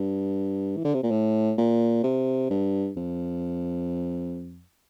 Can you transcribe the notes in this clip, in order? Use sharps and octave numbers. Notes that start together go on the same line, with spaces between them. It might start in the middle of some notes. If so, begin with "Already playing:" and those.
Already playing: G2
E3
D3
C3
A#2
A2
A#2
C3
G2
F2